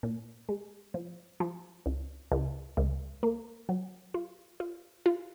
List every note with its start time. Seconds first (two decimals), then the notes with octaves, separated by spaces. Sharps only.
0.03 A#2
0.49 G#3
0.94 F3
1.40 F3
1.86 C#2
2.32 C#2
2.77 C#2
3.23 A#3
3.69 F#3
4.14 F4
4.60 F4
5.06 F4